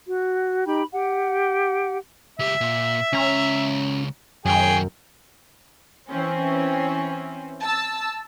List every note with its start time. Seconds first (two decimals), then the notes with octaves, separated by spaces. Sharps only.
0.08 F#4
0.66 D#4 G4 G5 B5
0.91 G4 F#5
2.39 C#2 G4 E5
2.61 A#2
3.13 C#2 C#4 A#5
4.45 F#2 D#3 F#3 G#4 G5
6.09 E3 C4 C#4
7.62 A5 E6